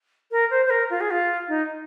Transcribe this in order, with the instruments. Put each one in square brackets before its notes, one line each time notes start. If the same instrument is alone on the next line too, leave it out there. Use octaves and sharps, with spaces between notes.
[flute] A#4
C5
C5
A#4
F4
G#4
F4
D#4